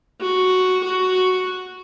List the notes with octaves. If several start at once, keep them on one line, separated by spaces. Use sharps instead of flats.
F#4
F#4